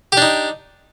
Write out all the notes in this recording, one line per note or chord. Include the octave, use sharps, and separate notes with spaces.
D4 D#4 G4